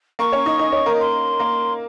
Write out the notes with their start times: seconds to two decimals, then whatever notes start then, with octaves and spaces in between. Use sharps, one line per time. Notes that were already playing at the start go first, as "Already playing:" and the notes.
0.19 A#3 A#4 C#6
0.32 C#4 C#5
0.46 D#4 D#5
0.59 D#4 D#5
0.72 C#4 C#5
0.86 A#3 A#4
1.00 C6
1.39 A#3 A#4